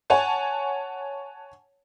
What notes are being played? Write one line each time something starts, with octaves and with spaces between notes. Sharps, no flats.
C#5 F#5 G#5 A5